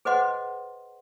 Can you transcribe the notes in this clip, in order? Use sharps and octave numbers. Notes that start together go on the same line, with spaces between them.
G#4 B4 C5 D#5 F#5 C6